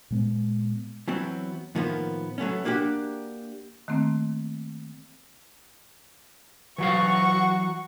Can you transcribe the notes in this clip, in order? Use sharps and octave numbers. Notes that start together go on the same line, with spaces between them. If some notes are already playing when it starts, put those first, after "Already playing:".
A#2 G#3 B3
E3 F#3 B3 C4
A2 D#3 F3 A#3 B3
F#3 A3 B3 C#4
A#3 D4 F#4 G4
D#3 A3 A#3 C4
E3 F#3 F#4 F5 C#6